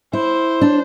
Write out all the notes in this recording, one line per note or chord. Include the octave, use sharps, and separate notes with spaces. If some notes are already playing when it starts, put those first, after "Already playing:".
E4 C5
D4